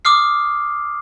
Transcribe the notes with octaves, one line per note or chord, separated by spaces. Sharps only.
D6 D#6 F6 C7